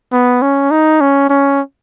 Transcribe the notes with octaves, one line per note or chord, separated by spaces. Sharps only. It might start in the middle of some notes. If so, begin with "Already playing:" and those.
B3
C#4
D#4
C#4
C#4